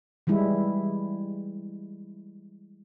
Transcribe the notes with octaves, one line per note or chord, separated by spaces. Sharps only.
E3 G3 G#3 E4